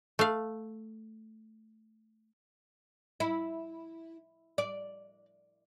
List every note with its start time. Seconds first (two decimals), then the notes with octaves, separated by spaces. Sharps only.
0.19 A3 F5
3.20 E4
4.58 D5